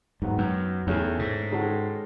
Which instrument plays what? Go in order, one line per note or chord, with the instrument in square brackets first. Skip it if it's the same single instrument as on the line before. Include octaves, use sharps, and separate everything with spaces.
[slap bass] G#2 [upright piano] D#3 F#3 B3
[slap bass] F#2
[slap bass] E2 [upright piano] D#3 A3 C#4 E4 G#4
[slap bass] G#2
[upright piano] D#3 G#3 C#4 F#4 A4